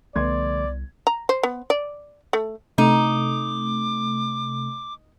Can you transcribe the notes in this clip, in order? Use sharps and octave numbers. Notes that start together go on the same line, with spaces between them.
C2 D3 F3 A3 B3 D5 C6 G#6
A#5
C5
B3
D5
A3
C3 A3 D#4 D6